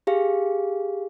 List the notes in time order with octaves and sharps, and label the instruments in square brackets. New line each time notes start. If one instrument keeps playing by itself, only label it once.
[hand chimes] G4 G#4 F5